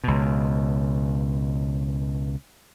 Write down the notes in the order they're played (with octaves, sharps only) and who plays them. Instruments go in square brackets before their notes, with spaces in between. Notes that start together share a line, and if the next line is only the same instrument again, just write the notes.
[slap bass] C#2 B2